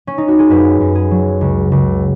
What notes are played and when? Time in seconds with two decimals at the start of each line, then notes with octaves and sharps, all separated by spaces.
0.07 C#4
0.18 D#4
0.28 F#4
0.39 G#4
0.49 F#2 B4
0.80 F#2
0.95 G#4
1.11 F#3
1.41 C#2
1.72 C#2